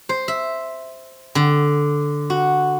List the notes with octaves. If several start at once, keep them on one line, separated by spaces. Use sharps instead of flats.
C5
E5
D3
F#4